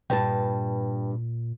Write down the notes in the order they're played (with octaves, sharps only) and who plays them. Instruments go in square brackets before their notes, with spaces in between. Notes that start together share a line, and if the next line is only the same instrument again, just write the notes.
[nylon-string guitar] G2 A5 [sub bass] A#2 [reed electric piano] B4 G5